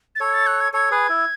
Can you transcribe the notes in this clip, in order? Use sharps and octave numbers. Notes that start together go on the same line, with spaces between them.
A6
A4 C#5 G#6
A6
F#6
G#6
A4 C#5 G#6
G#4 B4
E4